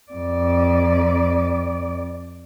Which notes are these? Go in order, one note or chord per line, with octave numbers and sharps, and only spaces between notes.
F2 D5